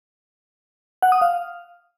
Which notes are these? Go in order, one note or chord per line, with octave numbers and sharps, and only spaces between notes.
F#5
D#6
F5